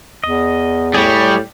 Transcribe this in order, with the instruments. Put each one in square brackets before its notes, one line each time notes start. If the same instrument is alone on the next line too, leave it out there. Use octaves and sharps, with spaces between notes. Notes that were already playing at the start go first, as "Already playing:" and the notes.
[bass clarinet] E2 [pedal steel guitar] D#5
[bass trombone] A2 [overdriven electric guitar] G3 [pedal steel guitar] G#4 C#5